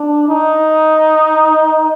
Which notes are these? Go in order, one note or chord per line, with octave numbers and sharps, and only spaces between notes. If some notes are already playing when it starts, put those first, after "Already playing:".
Already playing: D4
D#4